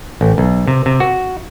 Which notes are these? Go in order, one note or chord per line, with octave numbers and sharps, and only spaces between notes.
A1
B1
C3
C3
F#4